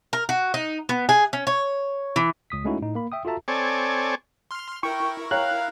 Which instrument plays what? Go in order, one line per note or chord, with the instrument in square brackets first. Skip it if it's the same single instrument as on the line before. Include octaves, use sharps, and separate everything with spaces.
[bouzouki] A#4
F#4
D#4
B3
G#4
C#4
C#5
E3
[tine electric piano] C#2 D#6 B6
G#3 A3 C#4 D#4 E4 F#4
A2 D#4
A#3 B5
E5 G5 D#6
F4 F#4 A4 E5 A5 A#5
[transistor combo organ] C4 A4 C#5 D5 G#5
[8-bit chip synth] C6 F6
[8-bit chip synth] E4 A#4 [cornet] G5 [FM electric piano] C#6
[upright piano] C#5 G5 A#5 [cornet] F5 [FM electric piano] F#6